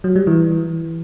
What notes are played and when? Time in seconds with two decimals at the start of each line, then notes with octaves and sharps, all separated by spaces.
0.04 F#3
0.16 G3
0.27 E3